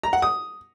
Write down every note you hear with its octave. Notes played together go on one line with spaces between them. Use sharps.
A#5
F#5
D#6